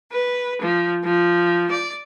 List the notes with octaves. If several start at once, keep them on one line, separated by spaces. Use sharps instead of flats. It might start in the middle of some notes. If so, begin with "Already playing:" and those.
B4
F3
F3
D5